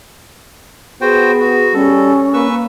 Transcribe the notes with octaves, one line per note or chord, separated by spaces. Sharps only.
B3 F#4 G#4 C5 G5
F#4
G3 C#4 A4
A#3 B4 C#6 E6